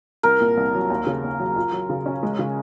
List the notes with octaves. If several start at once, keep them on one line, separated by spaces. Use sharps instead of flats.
C2 A#4
A#2
C2
F#3
D#2
C#3
D#2
F#3
F4
F#3
C#3
C#4
G#3
C#3